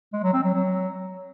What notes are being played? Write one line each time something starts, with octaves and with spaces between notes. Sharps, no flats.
G#3
F#3
C4
F#3
F#3